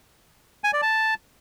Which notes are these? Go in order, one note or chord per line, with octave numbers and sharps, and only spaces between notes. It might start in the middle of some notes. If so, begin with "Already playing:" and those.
G#5
D5
A5